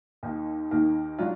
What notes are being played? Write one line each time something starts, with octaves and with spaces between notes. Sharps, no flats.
D#2 D#3 A#3 D#4
D#2 D#3 A#3 D#4
F#3 D4 F4